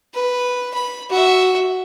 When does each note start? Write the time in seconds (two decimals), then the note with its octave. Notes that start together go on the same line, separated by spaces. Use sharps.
0.14 B4
0.74 B5
1.09 F#4 E5